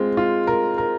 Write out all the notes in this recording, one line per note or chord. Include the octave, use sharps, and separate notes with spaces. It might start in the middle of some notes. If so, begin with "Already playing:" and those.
Already playing: G#3 C4 F4
F4
A#4
A#4